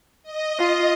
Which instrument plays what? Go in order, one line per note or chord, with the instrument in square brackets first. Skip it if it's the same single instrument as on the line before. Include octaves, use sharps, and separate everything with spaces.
[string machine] D#5
[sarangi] F4